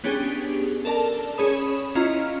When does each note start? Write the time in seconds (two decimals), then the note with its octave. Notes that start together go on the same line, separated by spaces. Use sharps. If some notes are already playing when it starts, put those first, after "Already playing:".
0.04 B3 C#4 D4 G4 G#4
0.85 A4 A#4 D5 A5
1.38 C#4 G#4 C#5 B5 D#6 E7
1.95 C#4 E4 F4 D#5 A#5 F6